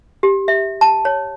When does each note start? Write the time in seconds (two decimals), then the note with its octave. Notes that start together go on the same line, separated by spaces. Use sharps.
0.23 G4
0.48 E5
0.81 A5
1.05 C#5